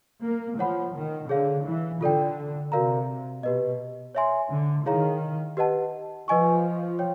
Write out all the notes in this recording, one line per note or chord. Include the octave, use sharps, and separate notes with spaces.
A#3
F3 C#5 F#5 B5
D#3
D3 G#4 C#5 F5
E3
D3 F4 A4 D5 G5
C3 F#4 A#4 D5 F5 A#5
B2 G4 B4 D#5
C#5 E5 G#5 C6
D3
D#3 E4 G#4 C#5 F5 A#5
G4 B4 D#5 F#5 A5
F3 B4 D#5 G#5 C#6
C#5 G5